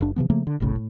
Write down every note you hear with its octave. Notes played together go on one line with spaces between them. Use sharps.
F#1 D4
C3 E3 F3 B3
C#3 F3 A3 A#3
D3
F#1 B1 A2 C#3
A2